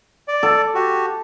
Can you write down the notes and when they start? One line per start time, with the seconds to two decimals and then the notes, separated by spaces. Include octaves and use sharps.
0.28 D5
0.43 A4
0.75 F#4 G4